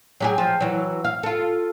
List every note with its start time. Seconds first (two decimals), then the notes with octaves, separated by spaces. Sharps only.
0.20 F#3 G4 G#4
0.38 F3
0.61 E3 F#3
1.04 F5
1.23 F4 A4